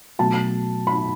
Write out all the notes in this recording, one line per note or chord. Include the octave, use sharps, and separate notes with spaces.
B2 F#3 A3 A5
B5